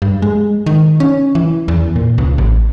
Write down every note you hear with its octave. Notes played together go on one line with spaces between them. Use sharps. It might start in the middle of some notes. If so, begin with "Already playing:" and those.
G2
G#3
D#3
C#4
E3
E2
A#2
C#2
A1